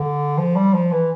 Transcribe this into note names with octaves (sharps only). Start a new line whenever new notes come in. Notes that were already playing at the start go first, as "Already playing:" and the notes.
Already playing: D3
F3
G3
F3
E3